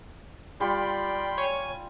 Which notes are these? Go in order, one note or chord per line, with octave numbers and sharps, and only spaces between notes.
G3 F4 D5 G5 B5 C6
C#5 G#5